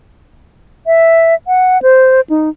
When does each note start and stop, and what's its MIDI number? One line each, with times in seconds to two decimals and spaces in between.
0.87 1.35 76
1.47 1.81 78
1.82 2.21 72
2.30 2.49 63